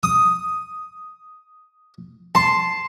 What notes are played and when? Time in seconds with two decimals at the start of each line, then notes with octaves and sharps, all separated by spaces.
0.03 D#6
2.35 A5 C6